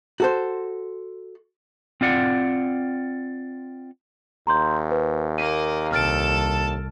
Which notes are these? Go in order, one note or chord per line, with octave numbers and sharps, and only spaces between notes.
F#4 A4 C5
C4 F4 D5 F#5
D#2 A#5 C6 G6
B4
A#3 A#4 D#7
C2 A4 A5 F6 A6 D7